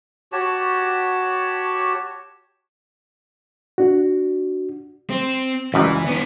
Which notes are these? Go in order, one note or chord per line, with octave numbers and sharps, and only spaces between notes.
F#4 G4 C#5 A5
D4 F#4
C4
C#2 F#2 E3 G3
B3 D4